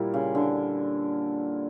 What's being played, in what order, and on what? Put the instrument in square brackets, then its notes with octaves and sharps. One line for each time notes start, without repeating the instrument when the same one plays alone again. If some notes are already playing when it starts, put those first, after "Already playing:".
Already playing: [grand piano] A#2 G3 A#3 E4
[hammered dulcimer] C#3
D3